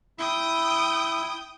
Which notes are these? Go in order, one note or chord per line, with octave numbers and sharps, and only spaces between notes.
E4 G5 D#6